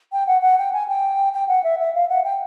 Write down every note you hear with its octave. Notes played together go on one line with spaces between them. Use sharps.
G5
F#5
F#5
G5
G#5
G5
G5
F#5
E5
E5
F5
F#5
G5